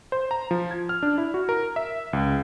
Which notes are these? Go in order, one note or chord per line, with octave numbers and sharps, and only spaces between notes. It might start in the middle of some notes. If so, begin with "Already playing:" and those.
C5
A#5
F3
G#6
F6
D4
E4
F#4
A#4
E5
C#2